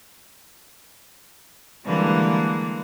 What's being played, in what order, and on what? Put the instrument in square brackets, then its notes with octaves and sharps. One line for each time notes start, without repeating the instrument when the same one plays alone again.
[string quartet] D3 E3 G3 G#3 A#3 B4